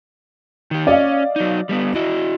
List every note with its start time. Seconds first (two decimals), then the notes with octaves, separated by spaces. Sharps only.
0.71 D#3 G4
0.87 C#4 D5 D#5 F5
1.36 F#3 D#4
1.69 G3 A#3 B3
1.95 E4 F#4 D#5